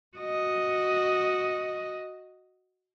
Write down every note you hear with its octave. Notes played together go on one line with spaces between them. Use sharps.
F#4 D#5